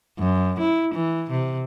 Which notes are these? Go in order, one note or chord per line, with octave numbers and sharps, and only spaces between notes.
F#2
E4
E3
C3